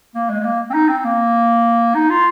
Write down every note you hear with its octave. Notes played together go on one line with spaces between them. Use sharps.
A#3
G#3
G#3
A#3
C4
D#4
C4
A#3
D#4
F4